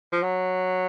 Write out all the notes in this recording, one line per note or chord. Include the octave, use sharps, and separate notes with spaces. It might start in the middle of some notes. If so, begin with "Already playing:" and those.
F3
F#3